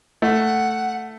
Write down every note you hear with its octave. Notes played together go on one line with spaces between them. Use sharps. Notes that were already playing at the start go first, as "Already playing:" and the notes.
A3 F#5